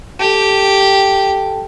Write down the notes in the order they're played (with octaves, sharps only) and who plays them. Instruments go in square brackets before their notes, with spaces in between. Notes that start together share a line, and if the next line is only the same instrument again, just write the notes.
[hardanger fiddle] G4 [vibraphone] A4 G5 A5